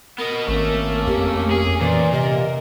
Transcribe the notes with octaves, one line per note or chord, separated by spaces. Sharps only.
B3 A#4 D#5
G#1 A3 A#3 C#4
F2 G4
G#4
A#2 E3 D5
C3 A#4 D#5